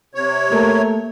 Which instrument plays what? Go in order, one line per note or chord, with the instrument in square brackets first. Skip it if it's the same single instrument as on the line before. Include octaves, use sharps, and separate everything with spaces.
[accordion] C3 C#5
[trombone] A3 [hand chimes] A#3 [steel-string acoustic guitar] A#4